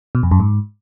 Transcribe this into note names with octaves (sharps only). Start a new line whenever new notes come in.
B2
F2
F#2
G#2